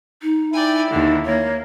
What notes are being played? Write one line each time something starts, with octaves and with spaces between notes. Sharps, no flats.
D#4
E4 D5 G5 G#5
D#2 D3 D#4
A#3 C#5